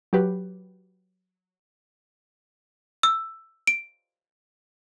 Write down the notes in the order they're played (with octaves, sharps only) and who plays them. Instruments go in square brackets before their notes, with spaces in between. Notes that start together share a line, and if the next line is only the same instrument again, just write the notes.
[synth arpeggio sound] F#3 G4 B4
[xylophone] E6
D7